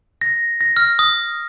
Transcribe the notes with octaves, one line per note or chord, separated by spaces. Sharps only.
A#6
A#6
F6
D#6